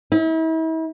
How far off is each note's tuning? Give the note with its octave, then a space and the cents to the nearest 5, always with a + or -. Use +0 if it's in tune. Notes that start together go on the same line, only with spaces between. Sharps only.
E4 -40